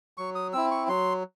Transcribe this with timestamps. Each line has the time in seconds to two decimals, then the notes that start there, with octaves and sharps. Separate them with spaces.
0.18 F#3 C#6
0.35 D#6
0.53 C4 E4 E6
0.71 C#6
0.88 F#3 C6